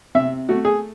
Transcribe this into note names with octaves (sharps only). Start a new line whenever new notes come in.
C3 E5
A3 F#4
G#4